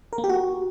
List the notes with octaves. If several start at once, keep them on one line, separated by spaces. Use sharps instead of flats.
A#4
A#3
G4
F#4